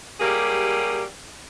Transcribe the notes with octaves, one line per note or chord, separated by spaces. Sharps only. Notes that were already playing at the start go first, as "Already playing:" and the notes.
F#3 G3 A#3 G4 G#4